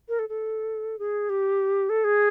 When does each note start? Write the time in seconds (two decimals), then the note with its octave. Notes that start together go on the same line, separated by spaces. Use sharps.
0.08 A#4
0.19 A4
0.29 A4
0.99 G#4
1.29 G4
1.89 A4
2.04 G#4